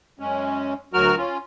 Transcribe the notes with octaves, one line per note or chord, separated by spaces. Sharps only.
F#2 G#3 C#4
D2 F#3 F#4 A#4 F6
C#4 F4